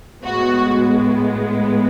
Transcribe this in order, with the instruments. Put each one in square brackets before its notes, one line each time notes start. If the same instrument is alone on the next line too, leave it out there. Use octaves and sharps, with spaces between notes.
[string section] A2 G#3 B3 F#4